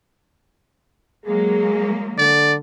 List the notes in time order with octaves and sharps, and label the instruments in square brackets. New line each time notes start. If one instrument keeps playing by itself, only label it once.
[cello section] F#3 G#3 A#3 [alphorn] G#4
[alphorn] D3 [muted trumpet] D5